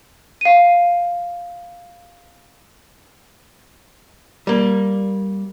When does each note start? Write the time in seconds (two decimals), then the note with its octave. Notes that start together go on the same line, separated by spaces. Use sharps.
0.41 F5 D#7
4.47 G3 A#3